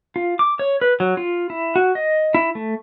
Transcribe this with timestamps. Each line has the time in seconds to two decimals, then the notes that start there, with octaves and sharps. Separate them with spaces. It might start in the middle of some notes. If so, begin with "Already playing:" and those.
0.16 F4
0.39 D6
0.59 C#5
0.81 B4
1.00 F#3
1.17 F4
1.50 E4
1.76 F#4
1.95 D#5
2.34 E4
2.55 A3